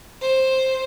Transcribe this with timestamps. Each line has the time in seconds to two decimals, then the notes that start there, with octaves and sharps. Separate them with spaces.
0.22 C5